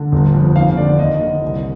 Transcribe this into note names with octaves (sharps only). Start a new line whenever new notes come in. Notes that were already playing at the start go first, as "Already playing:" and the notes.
Already playing: D3
G1
F2
D#2 F5
D3 D5
D#2 D#5
D3
C2